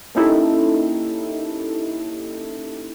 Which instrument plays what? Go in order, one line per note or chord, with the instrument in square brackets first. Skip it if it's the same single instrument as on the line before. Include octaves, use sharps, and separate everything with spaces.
[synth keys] A#3 C#4 D#4 E4 G4 A4